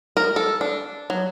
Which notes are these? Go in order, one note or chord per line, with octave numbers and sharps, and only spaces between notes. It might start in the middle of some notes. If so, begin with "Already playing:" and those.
A#4
A4
D4
F#3